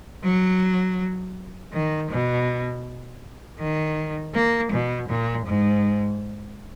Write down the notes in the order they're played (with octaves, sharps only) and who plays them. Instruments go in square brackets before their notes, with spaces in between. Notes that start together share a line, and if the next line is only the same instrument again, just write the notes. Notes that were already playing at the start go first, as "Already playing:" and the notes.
[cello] F#3
D#3
B2
D#3
A#3
B2
A#2
G#2